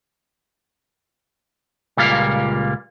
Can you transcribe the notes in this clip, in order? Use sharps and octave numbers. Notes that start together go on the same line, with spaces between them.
C#2 A#2 G3 A#3 F5